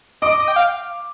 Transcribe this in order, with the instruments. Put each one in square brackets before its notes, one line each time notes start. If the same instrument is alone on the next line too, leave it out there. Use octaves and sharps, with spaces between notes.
[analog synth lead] D#5 [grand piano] D6 D7
[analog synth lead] D#5
G5
F5